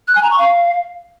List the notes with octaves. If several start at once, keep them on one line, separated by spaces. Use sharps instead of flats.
F#6
G#5
A#5
C#6
F5